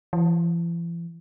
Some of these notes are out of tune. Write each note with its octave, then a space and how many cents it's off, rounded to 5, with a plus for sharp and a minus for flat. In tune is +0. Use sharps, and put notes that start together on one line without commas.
E3 +45